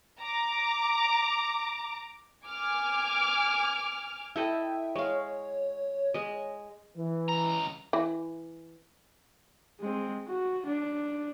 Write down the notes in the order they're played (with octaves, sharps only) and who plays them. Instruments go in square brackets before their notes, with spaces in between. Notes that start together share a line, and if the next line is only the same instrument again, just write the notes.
[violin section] A#5 D6
G#5 D6 F6
[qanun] E4 A4 D#5 [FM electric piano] E5 G5
[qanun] G#3 F5 [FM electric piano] C#5
[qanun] G#3 D#5
[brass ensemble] E3
[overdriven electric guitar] C#2 A#5
[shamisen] E3
[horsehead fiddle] G#3 C4
F#4
D4